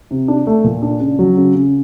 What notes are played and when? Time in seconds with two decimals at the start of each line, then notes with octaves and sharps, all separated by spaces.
0.11 C3
0.28 D4
0.47 A3
0.64 A#2
0.82 D4
1.00 C#3
1.19 F#3
1.37 C#3
1.55 C#3